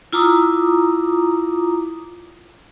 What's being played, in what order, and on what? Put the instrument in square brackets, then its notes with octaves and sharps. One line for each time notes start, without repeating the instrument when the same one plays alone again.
[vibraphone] E4 F4 A#5 D6 D#6